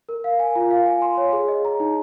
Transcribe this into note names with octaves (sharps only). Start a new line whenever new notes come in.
A#4
F5
G#5
F4
F5
G#5
C6
C#5
G#4
D#5
A#5
D#4